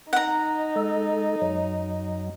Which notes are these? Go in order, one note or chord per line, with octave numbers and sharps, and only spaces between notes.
D#4 F#5 A#5
G#3 A4
F#2 F#3